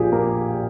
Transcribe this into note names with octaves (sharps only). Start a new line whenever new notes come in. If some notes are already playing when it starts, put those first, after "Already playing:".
Already playing: A#1 A#2 F3 G4 G#4
A#3 A#4